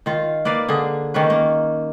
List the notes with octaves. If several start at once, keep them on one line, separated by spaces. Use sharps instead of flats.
D#3 F4
A#3 B4 D5 F5
D3 G#4
D#3 A#3 C#4 B4
A#3